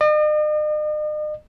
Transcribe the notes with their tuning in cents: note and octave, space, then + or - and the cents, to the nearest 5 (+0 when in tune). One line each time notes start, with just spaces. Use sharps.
D#5 -45